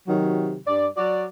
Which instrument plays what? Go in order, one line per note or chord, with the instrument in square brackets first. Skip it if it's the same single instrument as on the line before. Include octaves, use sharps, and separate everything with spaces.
[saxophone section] C3 D#3 F#3
G2 D5
F#3 F#4 D5